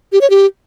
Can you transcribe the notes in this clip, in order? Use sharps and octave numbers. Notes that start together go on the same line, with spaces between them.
G4
C#5
G4